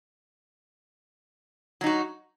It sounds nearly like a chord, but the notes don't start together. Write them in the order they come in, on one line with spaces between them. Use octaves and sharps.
F#3 D#4 F#4